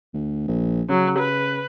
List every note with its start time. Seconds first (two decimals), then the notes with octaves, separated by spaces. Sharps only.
0.14 D2
0.48 A#1
0.89 C#3 F#3
1.19 B4